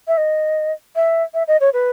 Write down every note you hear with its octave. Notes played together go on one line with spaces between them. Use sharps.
E5
D#5
E5
E5
D#5
C#5
B4